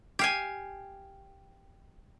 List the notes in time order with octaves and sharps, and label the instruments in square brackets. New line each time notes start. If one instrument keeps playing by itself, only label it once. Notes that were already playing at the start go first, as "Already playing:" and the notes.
[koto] G4 F5 G#5